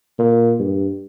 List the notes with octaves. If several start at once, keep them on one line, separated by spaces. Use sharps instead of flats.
A#2
G2